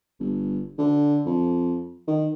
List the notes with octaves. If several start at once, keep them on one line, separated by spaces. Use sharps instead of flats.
G1
D3
F2
D#3